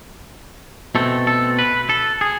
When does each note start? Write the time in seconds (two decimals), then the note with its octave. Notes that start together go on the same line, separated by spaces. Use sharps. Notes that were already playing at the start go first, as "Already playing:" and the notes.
0.95 B2 A3 C4 A4
1.27 A4
1.59 B4
1.89 A4
2.21 G#4